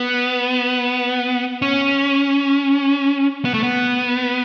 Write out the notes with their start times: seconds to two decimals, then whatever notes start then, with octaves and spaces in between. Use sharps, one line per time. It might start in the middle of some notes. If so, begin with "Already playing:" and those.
Already playing: B3
1.62 C#4
3.45 B3
3.54 A3
3.63 B3